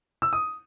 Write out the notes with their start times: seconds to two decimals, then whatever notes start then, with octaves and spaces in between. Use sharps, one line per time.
0.22 E6
0.33 D#6